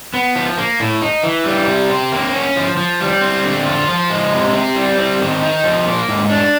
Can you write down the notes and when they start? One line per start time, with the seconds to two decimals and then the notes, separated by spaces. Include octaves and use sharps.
0.14 B3
0.36 F3
0.58 A#3
0.80 A2
1.01 D#4
1.23 E3
1.46 G3
1.67 C3
1.89 C4
2.12 A#3
2.33 C#4
2.56 F3
2.77 F3
3.00 G3
3.21 C4
3.43 D3
3.66 F4
3.88 F3
4.10 G#3
4.32 C3
4.54 C4
4.75 G3
4.98 C4
5.20 D#3
5.42 D#4
5.64 F3
5.86 A#3
6.08 G#2
6.29 D4